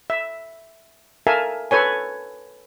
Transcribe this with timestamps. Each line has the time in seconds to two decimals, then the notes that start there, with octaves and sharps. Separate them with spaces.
0.10 E5
1.27 A4 A#4 E5 F5 G#5 A5
1.71 A4 B4 C#5 G#5